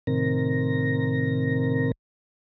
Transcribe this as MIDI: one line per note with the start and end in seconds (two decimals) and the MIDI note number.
0.07 1.92 45
0.07 1.92 48
0.07 1.92 51
0.07 1.92 60
0.07 1.92 70
0.07 1.92 94